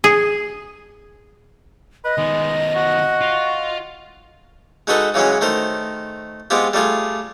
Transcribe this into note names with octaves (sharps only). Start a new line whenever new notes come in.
G#4
B4 D#5
D#3 G#3 B3
F#4
F4
G#3 D#4 F#4 A4 B4 D#5
C#3 E3 F#3 G#3 C#4
D#3 A3 A#4 C5
G#3 B3 C4 F4 G4
G3 A3 F4 G#4